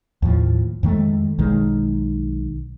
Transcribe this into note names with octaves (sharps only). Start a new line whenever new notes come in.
D#2 A2 F3
F2 D#3 G#3 A3
B1 D#3 G#3